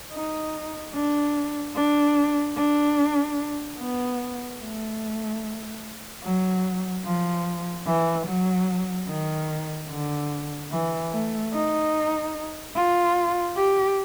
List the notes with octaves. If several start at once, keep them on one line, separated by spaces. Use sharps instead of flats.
D#4
D4
D4
D4
B3
A3
F#3
F3
E3
F#3
D#3
D3
E3
A3
D#4
F4
G4